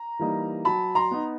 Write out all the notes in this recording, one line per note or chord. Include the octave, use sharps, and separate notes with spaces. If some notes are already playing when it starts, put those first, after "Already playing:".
Already playing: A#5
E3 G3 A#3 D#4
F#3 A5 B5
A#5 C6
B3 D#4